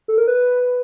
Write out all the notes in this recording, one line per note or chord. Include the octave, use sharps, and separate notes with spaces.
A4
A#4
B4